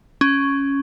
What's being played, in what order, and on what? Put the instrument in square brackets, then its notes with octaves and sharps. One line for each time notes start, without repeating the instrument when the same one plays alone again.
[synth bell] C#4